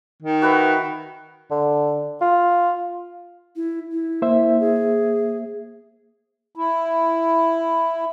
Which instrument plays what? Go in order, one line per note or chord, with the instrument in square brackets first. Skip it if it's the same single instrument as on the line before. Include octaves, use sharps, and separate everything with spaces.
[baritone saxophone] D#3
[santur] F#4 B4 E5
[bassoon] D3
F4
[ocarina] E4
E4
[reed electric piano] A#3 C5 E5
[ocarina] G#4
[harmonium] E4